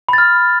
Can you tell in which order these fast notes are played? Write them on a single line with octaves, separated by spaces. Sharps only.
B5 A6 F6